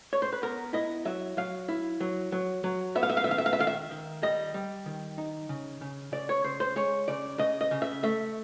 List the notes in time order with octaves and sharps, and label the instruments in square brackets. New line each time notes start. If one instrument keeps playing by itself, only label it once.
[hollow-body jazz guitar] C#5
C5
B4
B3 A#4
E4 D#5
F#3 E5
F#3 F5
E4
F#3
F#3
F#3
B3 E5
F5
E5
F5
E5
D#3 F5
E5
F5
E5
D#3 F5
E5
D#3
G3 D#5
G3
D#3
D#4
C#3
C#3
C#3 D5
C#5
C#3 C5
C5
G#3 C#5
C#3 D5
C#3 D#5
D#5
C#3
E5
A3 E5